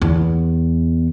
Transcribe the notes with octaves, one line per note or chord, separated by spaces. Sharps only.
E2